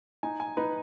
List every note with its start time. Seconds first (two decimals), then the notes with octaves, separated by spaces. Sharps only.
0.23 D#4 G#5
0.40 G#5
0.57 D#4 B4